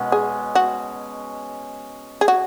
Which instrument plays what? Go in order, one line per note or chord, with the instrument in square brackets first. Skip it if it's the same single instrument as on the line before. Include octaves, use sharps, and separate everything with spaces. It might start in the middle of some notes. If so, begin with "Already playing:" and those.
Already playing: [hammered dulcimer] B2 G#3 C#4
[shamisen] G#4
F#4
G#4
F#4